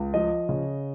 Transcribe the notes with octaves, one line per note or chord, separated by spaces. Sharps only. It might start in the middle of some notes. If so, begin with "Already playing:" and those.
Already playing: C#2
F3 D#5
C#3